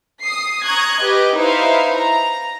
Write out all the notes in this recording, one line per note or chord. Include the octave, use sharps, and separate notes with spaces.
D#6 C7
A#5 C#6 D#6 F#6 G#6
G4 B4 D#5
D#4 E4 B4 C5 E5 F5
A#5